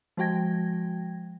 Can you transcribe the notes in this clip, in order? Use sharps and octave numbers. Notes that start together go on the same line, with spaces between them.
F3 G#3 F#4 G5 G#6 A#6